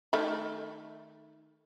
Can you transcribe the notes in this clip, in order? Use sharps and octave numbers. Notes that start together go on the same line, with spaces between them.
D#3 A3 B5